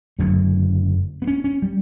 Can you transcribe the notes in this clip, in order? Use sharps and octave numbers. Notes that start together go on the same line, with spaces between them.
F#1 F#2 D3 A3
B3
C#4
C#4
G3